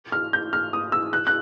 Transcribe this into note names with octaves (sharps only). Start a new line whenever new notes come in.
F6
G6
F6
D#6
E6
F#6
F#6